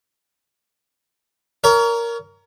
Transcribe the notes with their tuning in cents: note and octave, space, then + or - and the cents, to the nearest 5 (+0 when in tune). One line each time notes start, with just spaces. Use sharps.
A#4 +0 C#5 +35